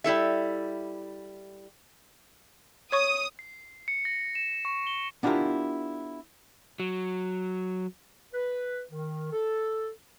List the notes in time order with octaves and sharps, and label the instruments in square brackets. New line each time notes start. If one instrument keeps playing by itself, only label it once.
[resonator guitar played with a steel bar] G3 E4 A4 E5
[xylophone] C#5 C#6 [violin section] D#6
[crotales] C7
C#7
A#6
E7
C#6
G7
[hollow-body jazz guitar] B3 D4 E4 F4 G4 A#4
[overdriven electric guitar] F#3
[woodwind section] B4
D#3
A4